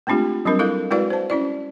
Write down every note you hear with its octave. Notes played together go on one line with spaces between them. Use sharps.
G#3 A3 C4 D4 F4 G4
F#3 G3 C4 D4 A#4
E4 A4 A#4 D#5 F5
G#3 E4 F#4 B4 D5 F5
C5 A5
C#4 E4 D5